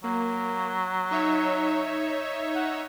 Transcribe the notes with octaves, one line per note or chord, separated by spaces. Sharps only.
F#3 A#3
D#4 C#5 E5
F#5